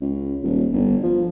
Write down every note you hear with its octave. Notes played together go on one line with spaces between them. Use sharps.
C#2
D#1
G1
F3